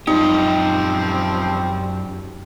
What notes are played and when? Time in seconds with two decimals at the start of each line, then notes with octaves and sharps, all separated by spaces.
0.07 F#2 F3 G3 C4 D#4 G4